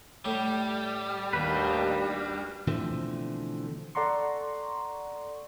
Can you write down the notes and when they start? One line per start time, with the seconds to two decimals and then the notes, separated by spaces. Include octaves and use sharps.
0.25 A2 G3
1.33 D#2 D4 F#4 B4
2.68 B2 D3 E3 F3 A3 C4
3.95 A4 D5 F#5 A#5 C6 C#6